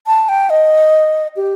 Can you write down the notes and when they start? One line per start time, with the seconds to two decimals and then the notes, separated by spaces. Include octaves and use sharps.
0.07 A5
0.29 G5
0.50 D#5
1.37 G4